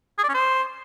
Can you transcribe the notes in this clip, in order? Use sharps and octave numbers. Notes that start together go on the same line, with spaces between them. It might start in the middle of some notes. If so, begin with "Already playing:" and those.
G#4
D5
C#4
C5